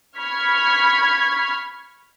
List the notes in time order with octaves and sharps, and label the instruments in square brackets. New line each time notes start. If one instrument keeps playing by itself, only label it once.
[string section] B5 C#6 F6 G#6 B6